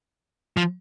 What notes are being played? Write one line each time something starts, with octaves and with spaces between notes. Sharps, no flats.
F3